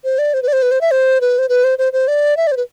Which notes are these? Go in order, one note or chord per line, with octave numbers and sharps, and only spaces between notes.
C5
D5
C5
B4
D5
C5
B4
C5
E5
C5
B4
C5
B4
C5
C5
C5
D5
E5
D5
C5
B4